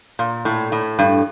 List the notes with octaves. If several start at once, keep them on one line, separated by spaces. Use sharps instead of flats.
A#2
A2
A2
G2